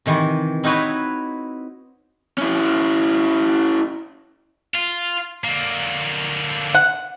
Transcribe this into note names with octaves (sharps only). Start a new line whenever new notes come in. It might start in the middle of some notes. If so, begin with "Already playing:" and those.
C3 D#3 E3
C4 D#4 E4 F#4 B4 C#5
C#4 E4
F4
D3 A#3
F#5